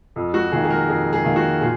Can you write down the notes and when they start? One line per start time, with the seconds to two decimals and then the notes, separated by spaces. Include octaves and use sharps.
0.16 F2
0.34 F#4
0.52 D#3 A#3 G#4
0.65 G#4
0.70 A#4
0.88 F2 G#4
1.13 G#4
1.24 D#3 A#3
1.36 F#4
1.61 A#2 G#4